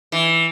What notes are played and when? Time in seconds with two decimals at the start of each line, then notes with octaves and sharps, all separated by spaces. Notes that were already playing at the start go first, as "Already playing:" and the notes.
0.12 E3